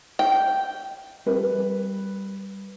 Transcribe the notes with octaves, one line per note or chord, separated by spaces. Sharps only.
G5
G3 B4